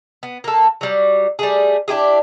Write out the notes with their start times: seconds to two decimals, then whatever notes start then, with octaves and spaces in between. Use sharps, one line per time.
0.23 B3
0.44 A#3 A4
0.81 F#3 G3
1.39 G3 A3 G#4
1.88 D4 E4 G4 G#4